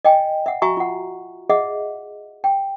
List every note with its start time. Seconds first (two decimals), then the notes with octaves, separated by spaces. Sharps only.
0.05 D#5 G5 G#5
0.46 E5 F#5
0.62 F#4 E5 G#5 A#5 C#6
0.77 F4 F#5
1.49 G#4 D#5 E5 F#5
2.44 G5